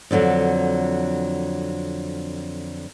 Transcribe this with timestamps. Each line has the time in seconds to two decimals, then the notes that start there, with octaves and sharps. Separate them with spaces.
0.11 F2 D3 E3 F#3